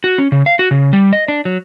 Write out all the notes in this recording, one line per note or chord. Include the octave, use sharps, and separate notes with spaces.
F#4
C#4
C#3
F5
F#4
C#3
G3
D#5
D4
F#3